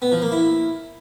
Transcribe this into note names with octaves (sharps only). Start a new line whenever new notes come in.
B3
F3
A#3
E4